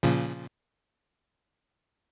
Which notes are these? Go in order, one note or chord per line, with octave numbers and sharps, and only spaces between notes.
A#2 C#3 F3